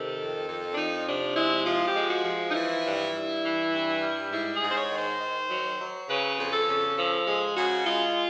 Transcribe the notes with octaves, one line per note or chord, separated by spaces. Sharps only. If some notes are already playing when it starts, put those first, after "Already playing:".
Already playing: C3 D#3 A4
F2
F2
D4
F3 D#4
C3 D4
G#3 E4
F3 F4
G4
G#3
F#4
F3
D#4
E3 E4
G2
G2
E3
G2
G3
G#2 E4
G#4
G#2
C5
C#5
D#3
C5
D#3
F#3
F#3
C#3 B4
F2
A4
C#3
F3 A4
G#3 G#4
C#3 F#4
G#3 F4